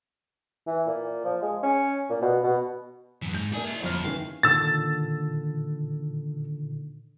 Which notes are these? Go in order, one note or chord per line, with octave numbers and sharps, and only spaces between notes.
E3
A#2
F3
G#3
C#4
A#2
B2
B2
F#2 E3
G#2 G6
A#3 D4 E4 G4 G#5
C#5 D#5
G1 F2 F3 F6
D#3 E3 C#4 F5
A#2 D3 D#3 E6 A6